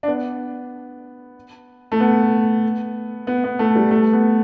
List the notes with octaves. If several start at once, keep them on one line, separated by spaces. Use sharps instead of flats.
D4
B3
A3
B3
B3
B3
A3
G3
A3
B3